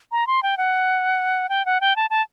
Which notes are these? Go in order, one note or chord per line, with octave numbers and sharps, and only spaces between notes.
A#5
C6
G5
F#5
G5
F#5
G5
A5
A5